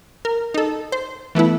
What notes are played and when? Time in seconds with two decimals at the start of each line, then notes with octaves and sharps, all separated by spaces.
0.25 A#4
0.54 D#4 A4
0.92 C5
1.35 E3 A3 B3 E4